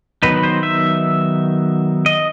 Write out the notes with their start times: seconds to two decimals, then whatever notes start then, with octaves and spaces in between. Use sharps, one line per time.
0.23 D#3 F#3 B3 D#4 B4
0.43 C5
0.63 E5
2.06 D#5